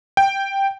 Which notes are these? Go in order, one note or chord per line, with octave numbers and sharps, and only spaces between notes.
G5